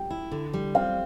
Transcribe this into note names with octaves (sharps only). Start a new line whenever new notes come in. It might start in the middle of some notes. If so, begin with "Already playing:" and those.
Already playing: G5
E4
D3
G3
C4 F5